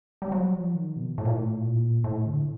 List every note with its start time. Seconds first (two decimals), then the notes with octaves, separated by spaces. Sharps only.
0.22 G3
0.32 F#3
0.53 F3
0.75 D#3
0.96 B2
1.18 A2
1.25 A#2
1.32 A2
1.61 A#2
2.04 A2
2.26 D3